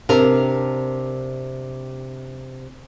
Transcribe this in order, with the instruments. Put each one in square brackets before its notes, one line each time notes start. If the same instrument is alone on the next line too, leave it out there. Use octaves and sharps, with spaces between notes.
[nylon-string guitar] C3 D4 A#4